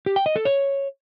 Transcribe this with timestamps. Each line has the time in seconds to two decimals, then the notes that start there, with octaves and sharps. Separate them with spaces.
0.06 G4
0.16 G5
0.26 D#5
0.36 A4
0.45 C#5